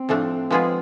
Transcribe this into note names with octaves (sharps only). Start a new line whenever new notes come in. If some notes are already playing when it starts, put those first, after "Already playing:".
Already playing: C4
A2 F3 A3 D4
F3 G#3 B3 F4 G#4